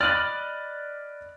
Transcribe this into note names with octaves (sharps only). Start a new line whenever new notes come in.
D5 D#5 B5 F6 F#6 A6